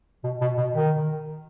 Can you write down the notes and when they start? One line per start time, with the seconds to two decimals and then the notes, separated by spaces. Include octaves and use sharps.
0.24 B2
0.41 B2
0.57 B2
0.74 D#3